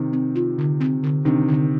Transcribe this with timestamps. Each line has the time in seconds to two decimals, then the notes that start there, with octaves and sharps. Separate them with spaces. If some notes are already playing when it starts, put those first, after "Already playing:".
Already playing: C3 D#3
0.13 C4
0.35 F4
0.58 D3
0.80 C4
1.03 D3
1.25 C3 D#3 D4
1.48 D3